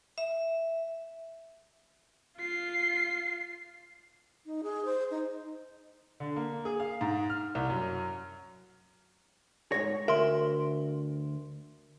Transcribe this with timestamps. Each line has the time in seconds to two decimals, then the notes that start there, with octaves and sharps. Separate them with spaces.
0.18 E5
2.38 F4 C7
4.46 D#4
4.63 G#4
4.85 C5
5.11 D#4
6.20 D3
6.36 A#3
6.65 G#4
6.80 F5
7.01 G#2
7.30 F6
7.55 C2
7.70 F#2
9.72 G#2 C#5 A#6
10.08 D2 A#4 E5 C6